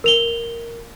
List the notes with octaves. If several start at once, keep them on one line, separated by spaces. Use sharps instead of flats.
A#4 F7 G7